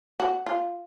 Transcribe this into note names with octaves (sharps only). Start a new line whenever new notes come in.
F#4
F4